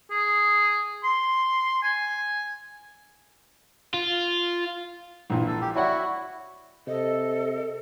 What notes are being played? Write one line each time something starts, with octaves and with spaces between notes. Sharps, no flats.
G#4
C6
G#5
F4
A#1 A#2 E3
A4
G4
E4 F#4 C#5 D5 F#5
C3 A4 D#5